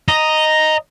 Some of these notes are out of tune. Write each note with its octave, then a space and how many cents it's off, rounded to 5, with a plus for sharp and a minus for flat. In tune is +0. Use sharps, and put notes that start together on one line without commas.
D#5 +0 A#5 +0